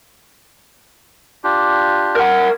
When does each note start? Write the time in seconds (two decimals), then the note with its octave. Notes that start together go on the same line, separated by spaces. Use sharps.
1.44 D4 F4 G4
2.16 A#4 F#5